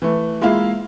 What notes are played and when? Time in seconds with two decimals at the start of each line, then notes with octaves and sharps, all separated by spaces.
0.02 E3 A3
0.41 G#3 A#3 E4 F4 E5 F5